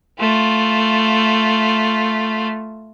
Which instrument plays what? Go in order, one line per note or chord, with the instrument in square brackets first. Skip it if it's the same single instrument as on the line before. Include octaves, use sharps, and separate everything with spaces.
[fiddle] A3 F4